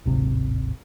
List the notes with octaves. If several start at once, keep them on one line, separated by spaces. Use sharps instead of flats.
D1 G#1 C3